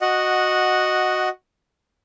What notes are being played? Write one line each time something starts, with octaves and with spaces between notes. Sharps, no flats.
F#4 D#5 F#5